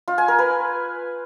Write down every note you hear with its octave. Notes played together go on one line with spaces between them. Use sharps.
F4
G#5
A#4
B4